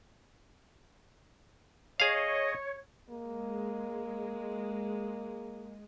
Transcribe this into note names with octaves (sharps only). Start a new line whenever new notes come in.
G#4 C#5 D#5 F5
G#3 A#3